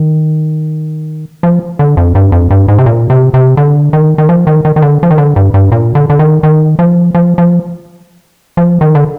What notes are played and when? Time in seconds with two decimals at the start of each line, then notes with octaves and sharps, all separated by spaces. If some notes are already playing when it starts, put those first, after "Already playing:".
Already playing: D#3
1.43 F3
1.79 D3
1.97 F2
2.15 G2
2.32 F2
2.51 G2
2.68 G#2
2.78 C3
2.86 A#2
3.10 C3
3.34 C3
3.57 D3
3.93 D#3
4.18 D#3
4.29 F3
4.47 D#3
4.65 D#3
4.76 D#3
4.82 D3
5.03 F3
5.11 D#3
5.18 D3
5.36 G2
5.54 G2
5.72 A#2
5.95 D3
6.10 D3
6.19 D#3
6.43 D#3
6.79 F3
7.15 F3
7.38 F3
8.57 F3
8.81 D#3
8.95 D3